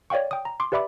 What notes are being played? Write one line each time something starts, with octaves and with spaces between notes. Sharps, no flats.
C#5 D5 F5 G5 C#6
G5 D#6
A#5
C6 D6
G4 B4 D5 E5 B5 D6